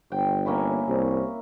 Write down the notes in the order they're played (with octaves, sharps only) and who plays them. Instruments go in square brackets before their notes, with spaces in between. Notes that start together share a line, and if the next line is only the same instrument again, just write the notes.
[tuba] G1 [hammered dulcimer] G5
[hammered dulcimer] A#3 C#4 E4
[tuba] C2